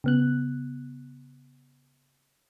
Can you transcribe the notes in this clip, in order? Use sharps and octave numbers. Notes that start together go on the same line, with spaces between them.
C#3 B3 F#6